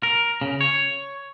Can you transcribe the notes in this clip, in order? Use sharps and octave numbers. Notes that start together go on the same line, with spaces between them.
A#4
C#3
C#5